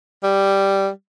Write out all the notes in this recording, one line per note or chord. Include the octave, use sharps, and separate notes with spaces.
G3